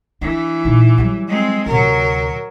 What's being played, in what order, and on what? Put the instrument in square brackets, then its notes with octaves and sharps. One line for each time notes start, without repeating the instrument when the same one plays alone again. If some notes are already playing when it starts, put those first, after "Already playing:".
[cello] E3 [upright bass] D4
[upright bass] A#2 D#4
F#3 G3
[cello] G#3 C4
[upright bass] D2 C3 [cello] F#3 A#4